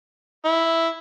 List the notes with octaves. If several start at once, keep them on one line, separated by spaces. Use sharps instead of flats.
E4